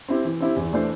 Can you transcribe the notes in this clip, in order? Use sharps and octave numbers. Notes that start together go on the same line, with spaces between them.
C4 E4 G4
E3
C4 E4 G4
E2
E3 A3 D4 C5